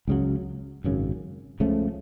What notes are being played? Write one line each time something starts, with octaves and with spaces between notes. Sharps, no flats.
C#2 C#3 F#3
G#1 F#2 C#3
C#2 C#3 F3 A3